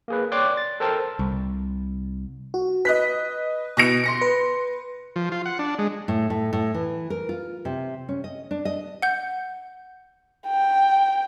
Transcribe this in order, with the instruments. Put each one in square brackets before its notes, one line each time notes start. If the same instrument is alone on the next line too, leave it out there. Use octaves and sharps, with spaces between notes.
[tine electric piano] A#3 G#4 B4
C#5 D5 G5 C6 D6 F#6
A6
A4 A#4 C5 G5 A5
[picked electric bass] C2
[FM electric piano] F#4
[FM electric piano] B4 [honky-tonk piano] D#5 F#6 B6
[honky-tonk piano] B2 A#6 D7
C6 A#6 C#7
[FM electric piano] B4
[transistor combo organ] F3
F4
F#5
D4
G#3
[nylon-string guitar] A2
A2
A2
E3
A#4
F4
C3
C#4
D#5
D4
D#5
[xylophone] F#5 G6
[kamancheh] G5